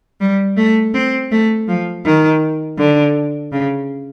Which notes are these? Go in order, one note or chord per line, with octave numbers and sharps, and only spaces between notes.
G3
A3
C4
A3
F3
D#3
D3
C#3